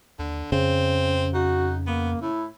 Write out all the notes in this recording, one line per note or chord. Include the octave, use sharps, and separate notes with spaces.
D#2 D3
F2 C#3 C4
D#4 F#4
A#3 B3
A2 E4